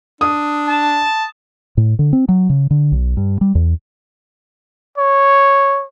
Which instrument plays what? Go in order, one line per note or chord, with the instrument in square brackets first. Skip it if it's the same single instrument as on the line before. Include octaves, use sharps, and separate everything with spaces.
[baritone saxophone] D4 [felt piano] D#6
[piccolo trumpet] A5
[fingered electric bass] A2
D3
C4
F#3
C#3
D3
B1
G2
G3
E2
[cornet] C#5